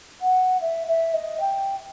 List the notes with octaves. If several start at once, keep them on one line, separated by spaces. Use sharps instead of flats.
F#5
E5
E5
D#5
G5